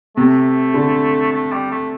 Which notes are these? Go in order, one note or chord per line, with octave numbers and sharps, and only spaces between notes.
C3 A3
D3
A3
G3
A3